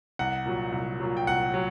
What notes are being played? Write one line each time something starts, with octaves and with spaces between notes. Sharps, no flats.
C2 F#5
A#2 F#3
C2
A#2 F#3
G5
C2 F#5
F#3